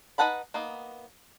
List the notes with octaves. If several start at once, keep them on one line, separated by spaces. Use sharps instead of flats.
D#4 B4 F#5 A5 B5
A#3 B3 D#4